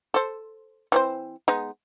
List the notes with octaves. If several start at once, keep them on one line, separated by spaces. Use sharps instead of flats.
A4 C5
E3 C4 C5
G#3 B3 D#4